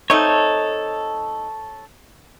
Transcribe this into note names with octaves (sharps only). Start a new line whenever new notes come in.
A3 C4 D#4 A4 C#5